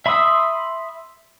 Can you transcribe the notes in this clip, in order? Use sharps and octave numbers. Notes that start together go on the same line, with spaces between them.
E5 B5 C6 D#6 E6